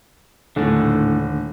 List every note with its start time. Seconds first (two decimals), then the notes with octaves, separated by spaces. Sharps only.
0.56 D#1 A2 D3